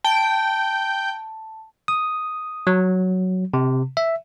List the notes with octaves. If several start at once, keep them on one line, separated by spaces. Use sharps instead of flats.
G5 A5
D#6
F#3
C3
E5